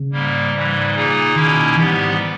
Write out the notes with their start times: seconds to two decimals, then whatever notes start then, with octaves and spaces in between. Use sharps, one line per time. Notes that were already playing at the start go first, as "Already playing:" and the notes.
Already playing: C#3
0.12 G#2 G3 A#3
0.53 G#2 E3 G3
0.94 A#2 A#3 D#4 G#4
1.35 B2 D#3 A#3 C#4 E4
1.76 G#2 E3 G3 B3 G4